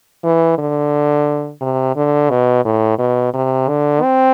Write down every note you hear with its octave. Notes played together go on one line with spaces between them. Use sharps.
E3
D3
C3
D3
B2
A2
B2
C3
D3
C4